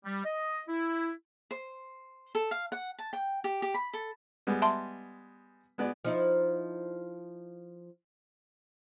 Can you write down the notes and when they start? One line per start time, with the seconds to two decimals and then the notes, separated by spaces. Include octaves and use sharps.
0.05 G3
0.25 D#5
0.69 E4
1.51 C5
2.35 A4
2.51 F5
2.72 F#5
2.99 A5
3.13 G5
3.44 G4
3.62 G4
3.74 B5
3.94 A4
4.47 G3 G#3 B3
4.62 E5 A5 C6
5.78 G#3 B3 D5
6.05 F3 D#4 E4